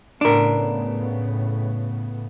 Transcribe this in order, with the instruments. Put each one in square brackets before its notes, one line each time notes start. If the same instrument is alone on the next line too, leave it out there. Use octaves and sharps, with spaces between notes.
[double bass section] A2 C#3 B3 [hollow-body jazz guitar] D4 A#4